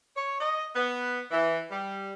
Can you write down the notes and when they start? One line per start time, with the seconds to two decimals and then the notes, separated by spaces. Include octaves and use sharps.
0.17 C#5
0.40 D#5
0.76 B3
1.31 E3
1.71 G3